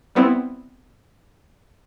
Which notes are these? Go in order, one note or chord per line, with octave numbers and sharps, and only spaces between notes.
G3 B3 C4 E4